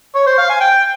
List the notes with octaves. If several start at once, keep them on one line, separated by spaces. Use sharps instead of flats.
C#5
C5
F5
G#5
G5